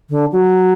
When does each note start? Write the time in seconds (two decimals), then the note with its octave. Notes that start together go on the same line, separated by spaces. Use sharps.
0.10 D3
0.32 F#3